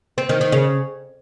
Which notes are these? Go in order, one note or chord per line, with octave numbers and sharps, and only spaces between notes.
C4
D#3
D#3
C#3